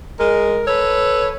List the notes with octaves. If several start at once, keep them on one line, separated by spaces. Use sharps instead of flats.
G#3 A#4
A4 B4 C#5